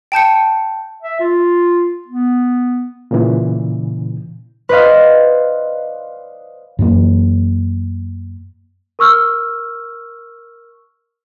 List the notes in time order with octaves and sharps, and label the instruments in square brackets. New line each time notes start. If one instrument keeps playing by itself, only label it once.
[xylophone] G5 A5 G6 C#7
[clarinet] E5
F4
B3
[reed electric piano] A#2 C#3 E3
[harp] B4 C5 D5 D#5 F5
[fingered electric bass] F#2 E3 F#3 A#3
[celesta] A#4 C#6 E6 F6